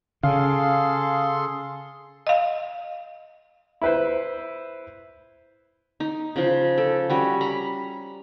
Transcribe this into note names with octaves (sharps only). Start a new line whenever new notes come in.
C#3 G#4 A4 F5 C6
D#5 F5
E4 B4 C5
D#4
C#3 F3
A4
G3 C#4 F#4
A#5 B5